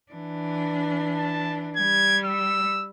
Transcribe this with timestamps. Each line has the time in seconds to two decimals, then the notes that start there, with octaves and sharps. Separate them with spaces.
0.12 E3 D4
1.18 A5
1.77 G3 G#6
2.26 E6